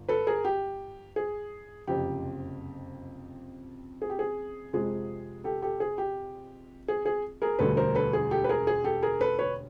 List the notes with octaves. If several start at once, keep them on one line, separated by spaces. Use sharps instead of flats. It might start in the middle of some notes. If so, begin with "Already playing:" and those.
Already playing: G1
A4 B4
G#4 A#4
G4
G#4
F#1 F2 C3 G4
G#4
G4
G#4
F2 C3 F3 G#3 G#4
G4 A4
G4 A4
G#4
G4
G#4
G#4
G#4 A#4
E1 D2 D3 G3 A4 B4
A#4 C5
A4 B4
G#4
G4 A4
B4
G#4 A#4
G#4
G4 A4
G#4 A#4
A4 B4
B4 C#5